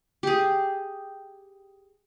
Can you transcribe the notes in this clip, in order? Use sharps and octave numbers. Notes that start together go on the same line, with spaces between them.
G4 G#4